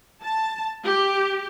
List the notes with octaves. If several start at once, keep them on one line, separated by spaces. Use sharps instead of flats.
A5
G4